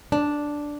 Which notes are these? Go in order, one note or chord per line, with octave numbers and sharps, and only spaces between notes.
D4